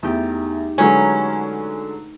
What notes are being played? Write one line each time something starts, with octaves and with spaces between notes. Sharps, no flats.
E2 A3 D#4 G4
D3 F#3 G#3 C#4 B4 A#5